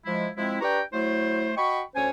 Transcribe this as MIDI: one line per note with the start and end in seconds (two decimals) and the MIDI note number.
0.05 0.28 53
0.05 0.28 56
0.05 0.28 64
0.36 0.57 53
0.36 0.57 56
0.36 0.57 60
0.36 0.57 64
0.61 0.80 62
0.61 0.80 67
0.61 0.80 71
0.61 0.80 79
0.61 0.80 82
0.61 0.80 85
0.93 1.51 54
0.93 1.51 57
0.93 1.51 64
0.93 1.51 72
1.56 1.82 66
1.56 1.82 75
1.56 1.82 79
1.56 1.82 83
1.56 1.82 85
1.95 2.10 38
1.95 2.10 61
1.95 2.10 72
1.95 2.10 73
1.95 2.10 80